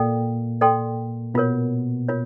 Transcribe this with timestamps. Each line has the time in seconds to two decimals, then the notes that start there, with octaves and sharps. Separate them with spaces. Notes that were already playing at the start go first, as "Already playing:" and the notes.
Already playing: A#2 A#3 A4 D5 G5
0.61 A4 D5 G5 C6
1.34 B2 B3 F4 A#4 C#5
2.08 F4 A#4 C#5